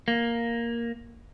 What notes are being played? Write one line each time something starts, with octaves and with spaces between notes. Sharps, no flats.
A#3